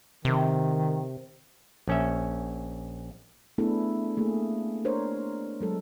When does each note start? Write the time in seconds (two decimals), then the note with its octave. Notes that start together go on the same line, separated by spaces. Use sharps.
0.25 C3 D#3
1.88 A#1 C#4 E5
3.58 A3 B3 D4 E4 G#4 A4
4.17 A3 A#3 G#4
4.85 D4 A#4 C5 C#5
5.61 F#3 G#3 A4